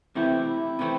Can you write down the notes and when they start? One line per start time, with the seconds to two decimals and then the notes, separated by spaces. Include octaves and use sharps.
0.15 C3 E3 A3 C4 E4 G4
0.47 E4
0.79 C3 E3 A3 C4